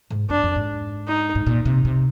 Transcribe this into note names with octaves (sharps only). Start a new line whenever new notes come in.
G#2
F2 D4
F2
G#2
D#4
G#2
A#2
C3
C3